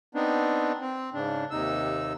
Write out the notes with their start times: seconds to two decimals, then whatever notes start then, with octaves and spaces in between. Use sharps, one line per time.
0.15 B3 C4 D4 D#4
0.80 C4
1.14 G#2 C#3 D4
1.51 D#2 C3 D#4 E6